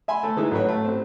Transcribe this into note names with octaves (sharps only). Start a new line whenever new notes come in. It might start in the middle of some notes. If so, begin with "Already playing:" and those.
E5 G#5 B5 C6
A3 A4
E3 G#3 D#4 E4
A1 F#3 B4 C#5
A3
A1 C4